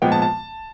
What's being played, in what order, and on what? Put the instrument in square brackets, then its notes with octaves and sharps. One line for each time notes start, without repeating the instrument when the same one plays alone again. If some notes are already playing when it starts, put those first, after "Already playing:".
[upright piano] A#2 F3 G#3 B3 G5
A5
A5